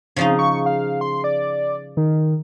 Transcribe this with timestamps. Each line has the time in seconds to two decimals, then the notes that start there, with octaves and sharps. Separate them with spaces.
0.16 C#3 F3 C4 D#4
0.39 C#6
0.66 F5
1.01 C6
1.24 D5
1.97 D#3